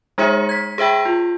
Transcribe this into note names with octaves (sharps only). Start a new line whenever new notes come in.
G#3 D#4 G#4 C#5 E5 C#7
G#6 B6
G#4 C5 E5 G5 B5
F4